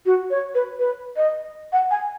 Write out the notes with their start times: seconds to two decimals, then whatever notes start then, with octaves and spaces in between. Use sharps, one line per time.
0.06 F#4
0.30 C#5
0.55 B4
0.79 B4
1.16 D#5
1.72 F#5
1.91 G#5